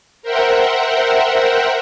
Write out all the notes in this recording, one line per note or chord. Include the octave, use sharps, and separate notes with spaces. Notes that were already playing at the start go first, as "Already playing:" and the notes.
A#4 C5 E5 F#5 G5